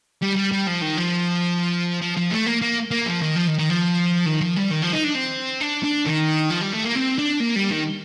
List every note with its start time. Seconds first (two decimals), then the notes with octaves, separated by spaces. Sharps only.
0.22 G3
0.36 G3
0.51 G3
0.67 F3
0.81 D#3
0.97 F3
2.01 F3
2.16 F3
2.31 A3
2.46 A#3
2.62 A#3
2.91 A#3
3.06 F3
3.22 D#3
3.36 F3
3.47 D#3
3.59 D#3
3.70 F3
4.26 D#3
4.41 F3
4.56 G3
4.71 D#3
4.82 F3
4.93 D#4
5.04 D4
5.16 C4
5.61 D4
5.83 D4
6.06 D#3
6.51 F3
6.62 G3
6.73 A3
6.85 A#3
6.95 C4
7.18 D4
7.40 A#3
7.56 G3
7.71 D#3